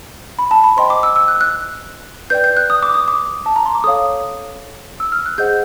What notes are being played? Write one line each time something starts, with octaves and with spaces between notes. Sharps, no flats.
B5
A5
B5
C5 D#5 G5 C6
D6
E6
E6
F#6
F#6
B4 D5 G5 G6
G6
F#6
D#6
D6
D#6
D6
A5
A#5
C6
D6
A4 C#5 F5 D#6
E6
F6
F#6
G#4 C5 D#5 F#5 G6